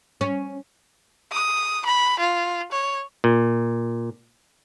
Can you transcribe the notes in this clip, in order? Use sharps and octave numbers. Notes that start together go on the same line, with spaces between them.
C#4
D#6
B5
F4
C#5
A#2